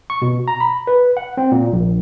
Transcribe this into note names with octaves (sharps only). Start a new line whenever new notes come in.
C#6
B2
A#5
B5
B4
F#5
C4
A#2
A#1